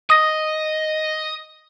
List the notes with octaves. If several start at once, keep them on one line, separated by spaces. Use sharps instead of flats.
D#5 D#6 A#6